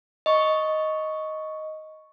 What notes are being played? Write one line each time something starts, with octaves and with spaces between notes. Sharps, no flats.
D#5 C#6